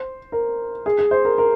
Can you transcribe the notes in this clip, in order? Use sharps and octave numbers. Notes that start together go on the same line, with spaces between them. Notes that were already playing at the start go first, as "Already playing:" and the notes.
Already playing: C5
A#4
G#4
G#4
C5
A#4
A#4